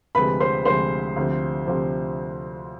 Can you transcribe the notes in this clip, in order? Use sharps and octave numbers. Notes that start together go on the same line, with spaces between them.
D2 C3 F3 G#3 B4 B5
C5 C6
D2 C3 F3 G#3 C5 C6
D2 C3 F3
D2 C3 F3